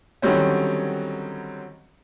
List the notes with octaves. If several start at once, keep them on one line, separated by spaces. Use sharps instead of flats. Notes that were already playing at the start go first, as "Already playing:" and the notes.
D3 D#3 F#3 G3 C4 C#4